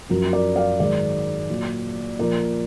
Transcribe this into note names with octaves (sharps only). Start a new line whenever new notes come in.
F#2 F3 F#4 A#4
A#4 D5
D5 F5
G#2 D#3 F#3 A#4 D5
A#2 F#3
A#2 F3 A#4 D5